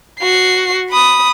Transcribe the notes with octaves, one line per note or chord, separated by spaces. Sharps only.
F#4 C7
B5 D#6